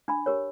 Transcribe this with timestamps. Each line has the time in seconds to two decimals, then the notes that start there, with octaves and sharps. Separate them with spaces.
0.08 D4 B5
0.26 G4 A#4 C#5